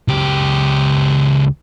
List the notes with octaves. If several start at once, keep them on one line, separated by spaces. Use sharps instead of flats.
C#2 G4